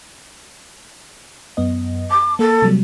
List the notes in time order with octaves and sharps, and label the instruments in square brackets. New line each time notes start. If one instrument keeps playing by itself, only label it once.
[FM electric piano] F#2 B3 D#5
[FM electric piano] A5 [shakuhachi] D6
[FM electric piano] A#3 [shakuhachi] A4
[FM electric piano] C3 F#3 G3